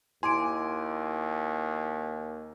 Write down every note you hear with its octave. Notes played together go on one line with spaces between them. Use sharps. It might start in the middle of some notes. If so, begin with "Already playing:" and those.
D#2 E4 G#5 C6 D6 D7